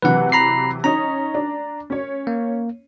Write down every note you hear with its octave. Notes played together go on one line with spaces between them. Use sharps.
C3 E3 F#3 B4 F#5
A#5 B5 C7
C#4 D#4 A#5
D4
C#4 C#5
A#3